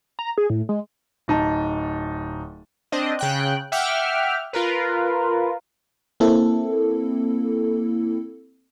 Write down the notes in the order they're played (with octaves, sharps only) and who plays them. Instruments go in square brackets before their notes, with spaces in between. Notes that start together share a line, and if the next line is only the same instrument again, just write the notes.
[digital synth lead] A#5
G#4
A2
G#3
[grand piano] D1 D#4 A5
[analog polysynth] C4 D4 D#5
C#3 G5 F#6
E5 F#5 G5 D6 F6
F4 A#4 B4
[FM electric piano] A#3 C4 E4 A4